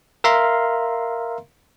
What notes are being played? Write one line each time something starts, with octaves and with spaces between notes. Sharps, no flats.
A#4 E5 F5 A#5 C6